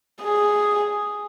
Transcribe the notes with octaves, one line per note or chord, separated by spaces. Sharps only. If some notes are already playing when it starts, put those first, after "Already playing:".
G#4